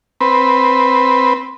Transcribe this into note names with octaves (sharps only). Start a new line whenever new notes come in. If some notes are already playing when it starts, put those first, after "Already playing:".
C4 B4